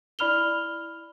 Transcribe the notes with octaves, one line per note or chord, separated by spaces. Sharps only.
E4 D5 B5 F6 F7 G7